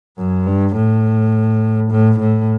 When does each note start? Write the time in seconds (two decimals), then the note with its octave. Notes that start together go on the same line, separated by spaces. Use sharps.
0.18 F#2
0.46 G2
0.76 A2
1.91 A2
2.20 A2